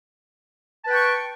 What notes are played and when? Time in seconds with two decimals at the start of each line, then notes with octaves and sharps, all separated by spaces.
0.84 A5
0.87 B4
0.90 G5
0.93 C#6